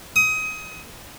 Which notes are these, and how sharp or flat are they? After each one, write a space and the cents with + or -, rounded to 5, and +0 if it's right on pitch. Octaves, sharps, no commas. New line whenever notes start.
D#6 +25